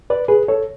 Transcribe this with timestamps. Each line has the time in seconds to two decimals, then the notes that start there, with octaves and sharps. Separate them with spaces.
0.10 B4 D5
0.28 G#4 B4
0.48 A4 C#5